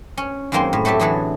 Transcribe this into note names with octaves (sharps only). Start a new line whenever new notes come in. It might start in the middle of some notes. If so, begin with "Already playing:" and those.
C#4
F#2 D#3 G#3 A#3 C4 C6
A2
F#3 A3 G4 A4 E5
A2 D3 E3 F#3 G#4 A4